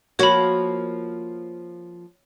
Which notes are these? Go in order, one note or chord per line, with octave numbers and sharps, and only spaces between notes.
F3 A#3 F#4 C#5 B5